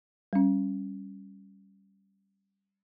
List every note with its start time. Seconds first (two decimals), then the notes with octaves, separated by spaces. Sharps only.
0.33 G3 C#4